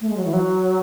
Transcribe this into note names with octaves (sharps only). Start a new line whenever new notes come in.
A3
G#3
F#3
E3
F#3